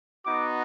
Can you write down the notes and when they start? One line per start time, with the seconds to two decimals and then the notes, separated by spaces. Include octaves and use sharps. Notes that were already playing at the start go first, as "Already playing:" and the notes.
0.25 B3 D#4 F#4 D6